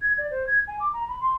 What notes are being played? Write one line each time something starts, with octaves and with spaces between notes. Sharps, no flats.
G#6
D5
C5
G#6
G#5
D6
A#5
B5
C6